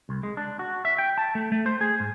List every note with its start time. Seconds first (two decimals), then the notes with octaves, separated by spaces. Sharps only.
0.09 C2
0.23 G#3
0.37 D4
0.59 F#4
0.85 E5
0.98 G5
1.18 A5
1.35 A3
1.52 A3
1.66 C5
1.81 G#4
2.00 G#2